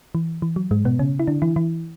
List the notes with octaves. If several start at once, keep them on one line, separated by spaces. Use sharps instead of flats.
E3
E3
F#3
G#2 G#3
B2 B3
C#3 C#4
E4
D3 D4
E3 E4
E3 E4